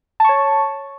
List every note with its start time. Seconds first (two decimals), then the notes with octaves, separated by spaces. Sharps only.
0.20 A5
0.24 C#6
0.29 C#5